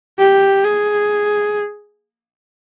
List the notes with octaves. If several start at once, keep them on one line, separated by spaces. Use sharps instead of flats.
G4
G#4